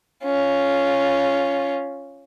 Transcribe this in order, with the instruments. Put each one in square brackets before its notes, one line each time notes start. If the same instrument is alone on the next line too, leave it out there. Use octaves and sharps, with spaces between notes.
[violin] C#4 F4